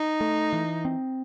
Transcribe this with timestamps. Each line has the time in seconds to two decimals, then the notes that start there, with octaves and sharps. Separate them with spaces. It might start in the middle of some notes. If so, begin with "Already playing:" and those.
Already playing: D#4
0.21 A3
0.53 E3
0.85 C4